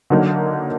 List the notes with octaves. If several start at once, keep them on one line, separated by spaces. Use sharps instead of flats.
D3 F#3 A#3 D#4